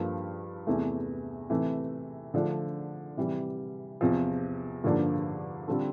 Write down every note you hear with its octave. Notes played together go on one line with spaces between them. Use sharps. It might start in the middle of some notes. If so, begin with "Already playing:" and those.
Already playing: G2 F3 A#3 F4 A4
E2 C3 E3 A3
C3 E3 A3
D3 F3 A3 D4
C3 E3 G3
E2 C3 F3
G2 D3 F3 A#3 D4
D3 G3 C4 F4 A4